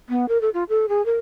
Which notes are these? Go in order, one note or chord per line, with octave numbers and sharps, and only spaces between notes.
B3
A#4
A4
F4
A4
G#4
A#4